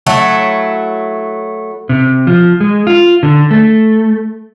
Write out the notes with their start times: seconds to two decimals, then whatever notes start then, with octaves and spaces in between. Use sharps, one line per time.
0.06 F#3 A3 E4
1.89 C3
2.27 F3
2.60 G#3
2.87 F4
3.23 D3
3.51 A3